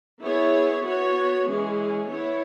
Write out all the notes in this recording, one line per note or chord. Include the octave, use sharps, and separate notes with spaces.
B3 E4 G#4 C#5
B3 F#4 C#5
E3 G#3 C#4 G#4
B3 E4 C#5